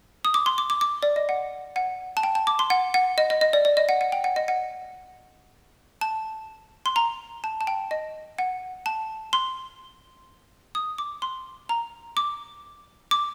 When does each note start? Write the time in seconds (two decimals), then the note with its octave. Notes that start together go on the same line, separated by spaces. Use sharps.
0.25 D#6
0.34 D6
0.46 C6
0.58 D6
0.70 D6
0.81 D6
1.03 D5
1.16 D#5
1.29 F#5
1.76 F#5
2.17 A5
2.23 G5
2.35 A5
2.47 D6
2.59 C6
2.70 F#5
2.94 F#5
3.18 D#5
3.30 D#5
3.41 D#5
3.53 D5
3.65 D5
3.77 D#5
3.89 F#5
4.01 F#5
4.12 G5
4.24 F#5
4.36 D#5
4.48 F#5
6.01 A5
6.86 C6
6.96 A#5
7.44 A5
7.61 A5
7.67 G5
7.91 D#5
8.38 F#5
8.86 A5
9.33 C6
10.75 D#6
10.98 D6
11.22 C6
11.69 A#5
12.17 D6
13.11 D6